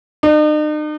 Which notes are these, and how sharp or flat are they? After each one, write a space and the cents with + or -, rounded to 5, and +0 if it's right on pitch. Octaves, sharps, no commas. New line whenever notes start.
D#4 -45